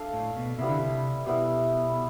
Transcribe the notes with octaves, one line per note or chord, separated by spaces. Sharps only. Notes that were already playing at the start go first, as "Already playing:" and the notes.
Already playing: D4 A4 D5 F5
A2
B2
C3 G3 B3 E4
D3
C3
B2 G3 B3 E4